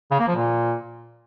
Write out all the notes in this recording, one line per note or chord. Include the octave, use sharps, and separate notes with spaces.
C#3
A#3
F3
A#2